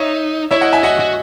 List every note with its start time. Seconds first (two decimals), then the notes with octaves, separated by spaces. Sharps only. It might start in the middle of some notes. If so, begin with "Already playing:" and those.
Already playing: D#4 C#5 E5
0.51 E4 C#5 E5
0.61 D#5 F#5
0.72 E5 G#5
0.83 F#4 D#5 F#5
1.00 F#4